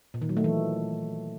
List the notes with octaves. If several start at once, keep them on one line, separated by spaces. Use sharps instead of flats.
A#2
D#3
F#3
A3
E3